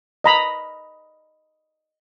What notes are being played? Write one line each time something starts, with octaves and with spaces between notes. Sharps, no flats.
D#5 A#5 B5